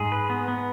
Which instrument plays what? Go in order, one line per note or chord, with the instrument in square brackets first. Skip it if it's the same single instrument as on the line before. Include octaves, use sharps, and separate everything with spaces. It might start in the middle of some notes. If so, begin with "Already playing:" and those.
Already playing: [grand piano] G#2 [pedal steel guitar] G#4
[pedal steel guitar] B4
B3
B3